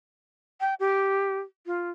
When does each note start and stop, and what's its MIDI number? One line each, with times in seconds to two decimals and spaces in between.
0.61 0.74 79
0.80 1.39 67
1.66 1.91 65